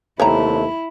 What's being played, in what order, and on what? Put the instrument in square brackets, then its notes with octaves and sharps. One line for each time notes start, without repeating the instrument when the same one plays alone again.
[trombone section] D#2 C3 A3 [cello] E4 [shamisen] C#5 G5 A#5